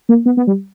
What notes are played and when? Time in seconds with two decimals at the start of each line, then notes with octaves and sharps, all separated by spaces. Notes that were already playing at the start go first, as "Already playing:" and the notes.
0.09 A#3
0.26 B3
0.37 B3
0.47 G3